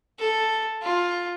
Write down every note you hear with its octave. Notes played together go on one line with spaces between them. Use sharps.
A4
F4